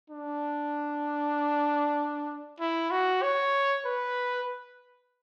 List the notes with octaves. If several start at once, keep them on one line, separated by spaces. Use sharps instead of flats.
D4
E4
F#4
C#5
B4